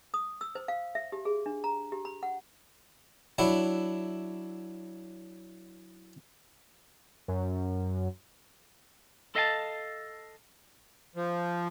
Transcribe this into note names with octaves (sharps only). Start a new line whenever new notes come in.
D#6
E6
C5
F5
E5
G4
G#4
D4
A#5
G4
B5
F#5
F#3 D4 E4
F#2
A4 D#5 F5 G5 A5
F3